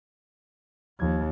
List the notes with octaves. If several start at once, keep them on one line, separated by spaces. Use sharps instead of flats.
D#2 F3 G#6